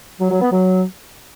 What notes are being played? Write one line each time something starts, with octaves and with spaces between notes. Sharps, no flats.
F#3
F#3
B3
F#3